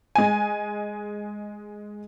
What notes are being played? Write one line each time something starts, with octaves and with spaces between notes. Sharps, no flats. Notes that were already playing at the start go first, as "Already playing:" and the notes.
G#3 G#5